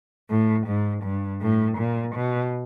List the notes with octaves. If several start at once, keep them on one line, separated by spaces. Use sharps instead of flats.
A2
G#2
G2
A2
A#2
B2